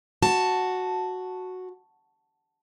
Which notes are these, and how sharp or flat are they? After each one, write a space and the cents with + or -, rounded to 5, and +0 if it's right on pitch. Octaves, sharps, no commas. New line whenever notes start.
F#4 -5 A5 +0